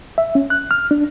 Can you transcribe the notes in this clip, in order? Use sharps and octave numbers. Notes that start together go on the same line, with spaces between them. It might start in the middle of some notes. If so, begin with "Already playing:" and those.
E5
C#4
F#6
F6
D4